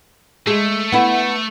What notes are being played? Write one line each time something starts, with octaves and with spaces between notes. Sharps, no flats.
G#3 A3
B3 E4